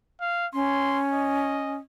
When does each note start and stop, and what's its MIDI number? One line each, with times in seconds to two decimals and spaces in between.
0.20 0.46 77
0.54 1.76 61
0.54 1.00 84
1.12 1.79 75